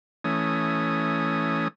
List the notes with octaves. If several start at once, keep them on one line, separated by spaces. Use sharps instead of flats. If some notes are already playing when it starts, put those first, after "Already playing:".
E3 A3 C#4 D#6